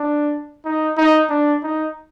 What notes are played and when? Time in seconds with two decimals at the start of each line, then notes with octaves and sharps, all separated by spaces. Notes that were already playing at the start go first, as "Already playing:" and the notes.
Already playing: D4
0.65 D#4
0.97 D#4
1.30 D4
1.63 D#4